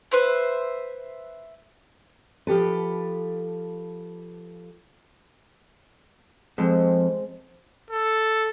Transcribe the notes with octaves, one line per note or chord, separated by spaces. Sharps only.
B4 C5 E5
F3 G4 A4 B4
F2 G#3 C4
A4